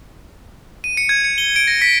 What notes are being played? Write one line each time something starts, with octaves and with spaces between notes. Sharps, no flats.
D#7
C#7
G#6
C#7
G7
D7
A#6
B6